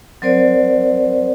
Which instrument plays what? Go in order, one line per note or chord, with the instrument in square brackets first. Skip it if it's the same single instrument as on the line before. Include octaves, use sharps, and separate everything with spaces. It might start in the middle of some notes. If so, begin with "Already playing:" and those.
[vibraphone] F#3 C4 A#4 C5 D5